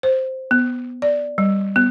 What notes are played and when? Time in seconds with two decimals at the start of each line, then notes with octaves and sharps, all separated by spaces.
0.03 C5
0.51 B3
1.02 D5
1.38 G3
1.76 B3